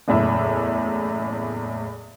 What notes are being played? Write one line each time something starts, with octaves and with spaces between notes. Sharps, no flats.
F#1 E2 A2 E5